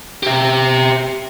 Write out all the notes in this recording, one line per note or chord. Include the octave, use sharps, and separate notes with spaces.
G4 E5